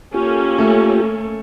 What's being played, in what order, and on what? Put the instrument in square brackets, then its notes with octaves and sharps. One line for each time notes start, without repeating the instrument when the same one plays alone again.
[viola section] A#3 C#4 A4 [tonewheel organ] F4 G4
[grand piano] A3